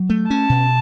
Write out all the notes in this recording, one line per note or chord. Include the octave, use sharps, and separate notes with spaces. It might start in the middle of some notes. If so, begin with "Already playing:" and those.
Already playing: F#3
A3
C#4 A5
B2